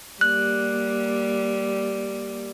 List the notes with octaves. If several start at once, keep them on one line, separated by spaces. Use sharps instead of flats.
G3 A#3 F#6